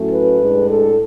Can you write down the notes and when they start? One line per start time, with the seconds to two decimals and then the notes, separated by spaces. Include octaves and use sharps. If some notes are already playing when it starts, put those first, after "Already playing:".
Already playing: A2 F#3 A3 C#4
0.11 B4
0.41 A2 G#3 D4
0.70 A4